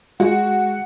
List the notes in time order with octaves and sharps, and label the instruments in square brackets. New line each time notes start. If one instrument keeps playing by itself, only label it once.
[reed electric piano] G#3 [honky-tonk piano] F#4 [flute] F#5